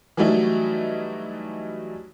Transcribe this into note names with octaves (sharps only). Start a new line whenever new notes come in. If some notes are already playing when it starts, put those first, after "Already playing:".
E3 F#3 G3 A3 D#4 E4